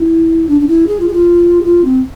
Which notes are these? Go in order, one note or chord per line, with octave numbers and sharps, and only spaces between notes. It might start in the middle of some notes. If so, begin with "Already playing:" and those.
Already playing: E4
D4
D4
E4
G#4
F4
G#4
F4
G#4
F4
C4